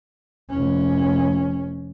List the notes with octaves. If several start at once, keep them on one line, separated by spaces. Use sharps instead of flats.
F1 C#4